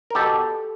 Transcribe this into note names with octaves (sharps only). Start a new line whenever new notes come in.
A#4
B2 G4 A4